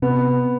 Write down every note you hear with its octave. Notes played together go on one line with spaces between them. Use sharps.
C3 B3